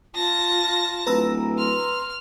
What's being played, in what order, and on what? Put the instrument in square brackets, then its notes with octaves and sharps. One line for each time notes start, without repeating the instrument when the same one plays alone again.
[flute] F4 [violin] A5 A#6
[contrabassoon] D1 [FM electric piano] B4 A#5 E6
[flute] C6 [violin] F6